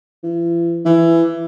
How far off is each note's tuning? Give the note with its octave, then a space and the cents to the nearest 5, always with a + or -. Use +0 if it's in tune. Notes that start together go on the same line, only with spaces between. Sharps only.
E3 +45
E3 +15